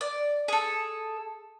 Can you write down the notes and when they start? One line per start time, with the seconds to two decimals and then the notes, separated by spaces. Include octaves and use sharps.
0.01 D5
0.48 G#4 A4